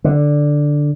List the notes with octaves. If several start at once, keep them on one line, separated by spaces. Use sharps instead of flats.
D3